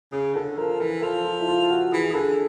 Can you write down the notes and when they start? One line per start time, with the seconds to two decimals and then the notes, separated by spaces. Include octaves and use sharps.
0.12 C#3 G#4
0.34 D3 A4
0.57 F3 A#4
0.80 E3 A4
1.02 F3 A4
1.24 F4
1.40 E4
1.48 F4
1.70 F#4
1.92 E3 G#4
2.10 G#4
2.14 D3 A4